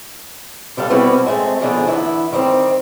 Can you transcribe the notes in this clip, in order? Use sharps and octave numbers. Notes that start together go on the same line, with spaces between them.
D3 G3 A4 F5
B2 G3 C4 E4 F#4 B4
G#3 A3 C4
B2 D3 D#3 F3 A#3 G#4
D2 E3 E4
D#3 G3 B3 C4